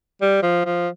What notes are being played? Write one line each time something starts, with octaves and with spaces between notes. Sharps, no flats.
G3
F3
F3